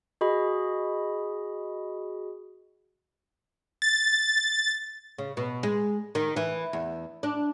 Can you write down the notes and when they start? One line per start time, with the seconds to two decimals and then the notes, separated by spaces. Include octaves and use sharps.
0.21 F#4 G#4 D#5 B5
3.82 A6
5.18 C#3
5.37 B2
5.63 G#3
6.15 D#3
6.36 E3
6.73 E2
7.23 D4